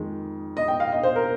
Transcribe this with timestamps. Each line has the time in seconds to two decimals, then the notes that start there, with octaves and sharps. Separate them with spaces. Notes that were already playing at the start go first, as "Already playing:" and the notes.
Already playing: F2 D#3 G#3
0.57 D#5
0.68 G5
0.80 F5
0.92 D#5
1.03 C5
1.16 A#4